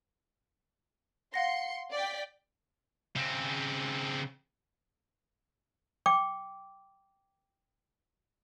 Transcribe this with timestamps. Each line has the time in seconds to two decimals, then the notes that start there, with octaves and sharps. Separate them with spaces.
1.34 F5 F#5 C6 A#6 C#7
1.93 D5 G5 B6
3.16 C#3 C4
6.06 G5 D6